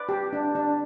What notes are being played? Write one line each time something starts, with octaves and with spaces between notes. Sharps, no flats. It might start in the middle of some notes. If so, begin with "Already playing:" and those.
Already playing: B4 D5
G4
D4
D4